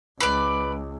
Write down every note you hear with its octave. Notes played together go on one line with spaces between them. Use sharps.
C#2 B4 D5